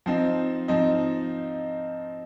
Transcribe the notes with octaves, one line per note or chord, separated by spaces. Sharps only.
F3 C4 D#4
F3 C4 D#4